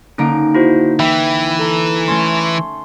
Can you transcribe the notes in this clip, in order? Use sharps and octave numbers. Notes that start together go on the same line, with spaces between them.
D3 A#3 C#4 D#4 D7
E4 F#4 C5
E3 E5 G5 B5
A4 A#5
A3 C#4 C6